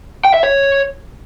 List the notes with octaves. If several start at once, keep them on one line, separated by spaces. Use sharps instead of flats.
G5
E5
C#5